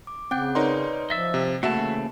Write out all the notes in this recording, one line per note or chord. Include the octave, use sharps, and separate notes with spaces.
D6
C#3 C4 F#5 G5 G6
D#4 A#4 B4 C#5 D5 C6
F3 D#5 E5 E6 A6
C3
C#3 E3 A3 A#3 F#4 E5 A5